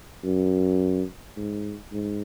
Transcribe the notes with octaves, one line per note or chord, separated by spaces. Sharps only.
F#2
G#2
G#2